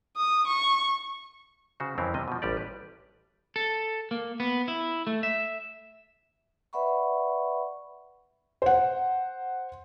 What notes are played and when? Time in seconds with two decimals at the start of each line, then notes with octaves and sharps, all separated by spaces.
0.17 D#6
0.48 C#6
1.80 C#3 F#4 C5
1.98 F2 C#3 E3 C4 C#4 A#4
2.14 C3 G3 D#5
2.28 B2 F3
2.42 A1 G3 G4 D5
2.57 B4
3.56 A4
4.11 A#3
4.40 B3
4.68 E4
5.07 A3
5.23 E5
6.73 B4 D5 E5 F#5 B5 C#6
8.62 C5 F#5